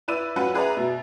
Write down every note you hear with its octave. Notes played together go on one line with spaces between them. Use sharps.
E4 B4 D5 E6 D#7
F#3 C#4 F4 B4 F#5
G#4 B4 D5 E5 A#5
B2 E5